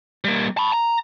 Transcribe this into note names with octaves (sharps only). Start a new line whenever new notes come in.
G3 A#3
A5 B5
A#5